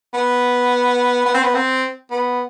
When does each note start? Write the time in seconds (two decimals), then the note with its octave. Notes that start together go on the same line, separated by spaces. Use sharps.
0.14 B3
1.26 B3
1.34 C4
1.43 B3
1.54 C4
2.11 B3